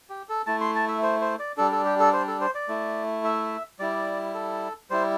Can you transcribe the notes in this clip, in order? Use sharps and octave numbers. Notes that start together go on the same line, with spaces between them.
G4
A4
A3 E4 A5
C6
A5
E5
C5
C5
D5
G3 D4 A4
A4
G4
A4
C5
A4
C5
D5
A3 E4
E5
G3 E4 D5
A4
G3 E4 C5